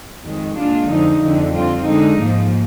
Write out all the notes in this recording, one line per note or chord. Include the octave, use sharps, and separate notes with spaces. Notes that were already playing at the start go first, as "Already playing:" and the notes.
F2 D#3 G#3
A#2 G#3 D4 F4
F2 D3 F3 G#3 D#4
F2 D3 F3 G#3
D3 G3 C4 F4
D3 G#3 D#4
G#2 F3 A#3